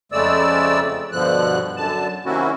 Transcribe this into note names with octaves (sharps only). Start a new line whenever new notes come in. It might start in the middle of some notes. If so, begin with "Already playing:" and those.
F2 C#3 G#3 A3 D5 E6
G2 B2 D3 F3 F#6
F#2 D3 A5
C3 D#3 A#3 C#4 E4 F#4